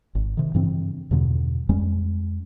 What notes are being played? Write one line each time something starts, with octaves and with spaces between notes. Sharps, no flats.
G#1
C3 D#3
G2 C#3 E3 C4
E2 G2 B2 D3
F2 G3 G#3 C#4